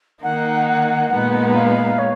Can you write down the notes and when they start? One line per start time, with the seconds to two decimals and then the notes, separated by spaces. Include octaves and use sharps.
0.23 D#3 A#3 D#4 F#5
1.10 A#2 G#3 B3 D#4 F#5
1.33 F#5
1.54 F5
1.98 C#5